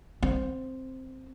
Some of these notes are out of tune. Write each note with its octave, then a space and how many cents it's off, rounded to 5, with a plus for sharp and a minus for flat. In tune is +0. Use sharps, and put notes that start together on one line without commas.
C4 +0